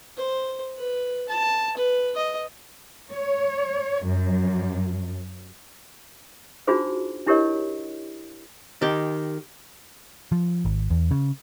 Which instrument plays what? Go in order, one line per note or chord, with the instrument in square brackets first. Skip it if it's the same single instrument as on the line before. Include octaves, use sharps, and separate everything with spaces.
[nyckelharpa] C5
B4
A5
B4
D#5
[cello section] C#5
F#2
[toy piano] D4 D#4 F4 F#4 G#4 C5
D4 E4 G4 A#4 C#5 D#5
[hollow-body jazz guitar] D#3 G4
[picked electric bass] F3
G#1
E2
C#3